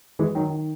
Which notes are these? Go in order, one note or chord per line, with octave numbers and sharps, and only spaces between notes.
E3 G#3
D#3 F#3
D#3